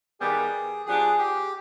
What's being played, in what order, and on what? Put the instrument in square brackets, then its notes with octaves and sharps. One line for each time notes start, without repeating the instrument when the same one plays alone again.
[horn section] D#3 G3 B3 [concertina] G#4
[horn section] F3 B3 D4 G4 [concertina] G#4
[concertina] G4